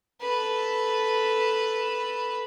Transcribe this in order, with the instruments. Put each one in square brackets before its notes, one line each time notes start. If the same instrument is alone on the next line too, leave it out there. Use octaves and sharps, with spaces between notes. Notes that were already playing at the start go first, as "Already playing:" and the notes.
[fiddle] A4 B4